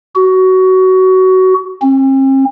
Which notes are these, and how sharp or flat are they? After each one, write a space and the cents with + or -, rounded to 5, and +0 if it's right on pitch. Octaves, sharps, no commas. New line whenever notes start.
F#4 +20
C4 +45